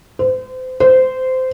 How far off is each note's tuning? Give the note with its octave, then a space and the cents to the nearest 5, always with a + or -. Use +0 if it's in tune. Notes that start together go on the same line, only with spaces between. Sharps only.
C5 -35
C5 -20